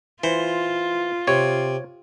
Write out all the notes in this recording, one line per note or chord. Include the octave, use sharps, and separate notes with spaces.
E3 F4 C5
C3 C#5